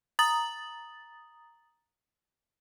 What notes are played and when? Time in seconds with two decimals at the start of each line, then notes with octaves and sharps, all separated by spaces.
0.19 A#5 D#6 A6 F#7